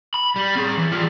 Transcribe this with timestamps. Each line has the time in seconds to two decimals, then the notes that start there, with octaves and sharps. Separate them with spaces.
0.14 B5
0.36 G3
0.55 C4 G#4
0.77 E3
0.92 G3 F4